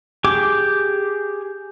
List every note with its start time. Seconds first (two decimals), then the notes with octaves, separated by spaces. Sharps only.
0.24 G4 G#4 G5 D6